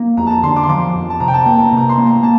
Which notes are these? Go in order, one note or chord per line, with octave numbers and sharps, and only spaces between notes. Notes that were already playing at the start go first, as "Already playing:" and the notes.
Already playing: A#3
F2 A#5
A5
A#5
D3 C6
D6
C6
F3 D6
F2
A5
C3 A#5
G5
A5
A#3 A#5
A#5
C3 A#5
C6
A#3
A#5
A#3 A5